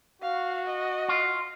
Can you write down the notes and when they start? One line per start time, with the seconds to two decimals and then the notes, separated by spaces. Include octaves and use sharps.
0.22 F#4 F5
0.67 D#5
1.08 F4